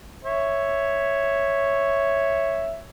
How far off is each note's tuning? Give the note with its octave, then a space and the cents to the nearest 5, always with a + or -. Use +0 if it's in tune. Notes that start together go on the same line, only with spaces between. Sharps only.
C#5 +0 E5 +0